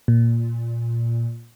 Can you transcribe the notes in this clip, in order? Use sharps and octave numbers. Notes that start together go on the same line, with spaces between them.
A#2